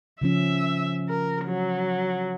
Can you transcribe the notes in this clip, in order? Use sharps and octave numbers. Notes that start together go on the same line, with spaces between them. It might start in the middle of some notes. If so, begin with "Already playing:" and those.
C#3 F3 C#4 E5
A#4
F#3